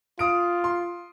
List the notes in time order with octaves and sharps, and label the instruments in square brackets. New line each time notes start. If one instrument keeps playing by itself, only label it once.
[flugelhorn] F4 [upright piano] F5 D#6 D7
[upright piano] C6